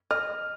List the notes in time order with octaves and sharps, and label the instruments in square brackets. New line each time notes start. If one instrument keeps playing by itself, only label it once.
[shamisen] D#5 [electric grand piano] F6